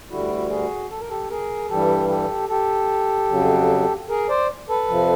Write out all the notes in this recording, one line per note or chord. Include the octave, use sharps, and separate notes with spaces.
D2 D3 G3 E4 F#4
F#4 G#4
A4
A#4
G4 A4
G#4 A#4
G2 E3 G3 G4 A4
G4 A4
G4 A4
F2 C#3 F#3
G#4 A#4
C5 D5
A4 B4
F2 C3 F3